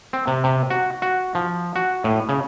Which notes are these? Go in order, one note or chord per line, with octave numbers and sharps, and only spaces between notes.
C4
C3
C3
F#4
F#4
F3
F#4
A2
C#3